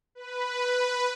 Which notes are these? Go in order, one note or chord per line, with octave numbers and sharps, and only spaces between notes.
B4